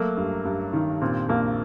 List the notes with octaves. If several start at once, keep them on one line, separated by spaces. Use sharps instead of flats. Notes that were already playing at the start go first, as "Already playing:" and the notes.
Already playing: F#3 A3 A#3
G2
G2
D#3
A#2 C4
A#1 A#3